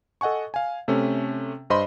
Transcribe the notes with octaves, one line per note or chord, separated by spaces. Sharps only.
A4 D#5 F#5 G#5 C#6
F5 G#5
C3 A3 C#4
G2 C5 D#5 B5 C6